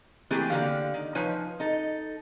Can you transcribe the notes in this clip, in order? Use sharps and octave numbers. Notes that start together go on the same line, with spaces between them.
E3 A3 A#3 C4 G4 G#4
D3 A#3 D#4 F#4 G4 F5
D#3
F3 D#4 B4 C#5 G#5
D#4 A4